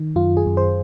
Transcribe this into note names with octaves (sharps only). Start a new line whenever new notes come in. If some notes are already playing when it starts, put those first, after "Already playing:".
Already playing: D#3
F#2 F4
G#4
F#2
C5